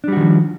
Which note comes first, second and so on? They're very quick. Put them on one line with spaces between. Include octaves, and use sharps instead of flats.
D4 G3 F#4 D#3 F3